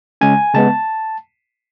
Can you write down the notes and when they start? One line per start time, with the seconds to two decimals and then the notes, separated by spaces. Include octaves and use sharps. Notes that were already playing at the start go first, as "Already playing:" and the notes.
0.21 C#3 G#3 C#4 G#5
0.54 C#3 G#3 B3 A5